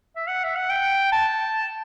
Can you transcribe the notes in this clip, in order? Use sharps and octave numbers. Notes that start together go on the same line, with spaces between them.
E5
F#5
E5
F#5
G5
A5